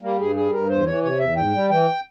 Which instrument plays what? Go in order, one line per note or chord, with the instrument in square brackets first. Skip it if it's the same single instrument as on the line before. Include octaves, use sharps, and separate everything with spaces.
[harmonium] G3 A#3
G2 G#4
G3 G#4
G2 A#4
E2 C5
E3 C#5
C3 C#5
E2 E5
G#2 G5
G3
E3 G5